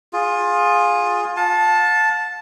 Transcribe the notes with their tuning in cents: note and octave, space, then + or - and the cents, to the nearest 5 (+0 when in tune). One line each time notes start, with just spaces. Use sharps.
F4 +15 G#4 -10
F5 +40 A5 -5